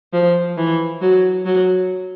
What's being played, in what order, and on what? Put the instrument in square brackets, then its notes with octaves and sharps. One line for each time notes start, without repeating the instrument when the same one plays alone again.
[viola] F3
E3
F#3
F#3